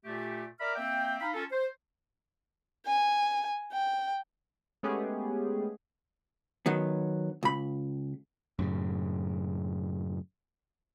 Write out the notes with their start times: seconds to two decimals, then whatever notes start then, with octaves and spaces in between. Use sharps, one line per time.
0.04 A#2 A3 G4
0.59 A#4 D5 E5 A#5 B5 F6
0.76 A#3 C4 E5 G5
1.21 D#4 F5 B5
1.34 C#4 F4 A4
1.51 C5
2.86 G#5
3.73 G5
4.83 G#3 A3 B3 C#4 G4 G#4
6.66 D#3 F#3 B3
7.43 C#2 B5
8.58 F#2 A2 C#3